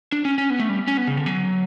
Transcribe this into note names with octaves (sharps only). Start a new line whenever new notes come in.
D4
C#4
C#4
B3
A3
G3
C#4
B3
C#3
D3
F#3